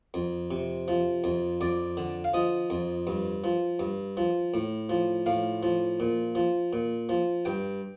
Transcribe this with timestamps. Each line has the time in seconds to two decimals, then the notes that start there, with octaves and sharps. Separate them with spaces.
0.14 F2
0.51 C3
0.88 F3
1.24 F2
1.61 F2 D5
1.97 D3
2.24 F5
2.34 F3 D#5
2.70 F2
3.07 G2
3.44 F3
3.79 G2
4.17 F3
4.54 A2
4.89 F3
5.26 A2 F5
5.63 F3
6.00 A#2
6.35 F3
6.73 A#2
7.09 F3
7.45 G2 G5